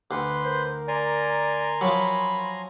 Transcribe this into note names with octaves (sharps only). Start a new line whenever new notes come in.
D2 B4 C6
A#4 C5
D5 G#5 A#5 C6
F3 F#3 B5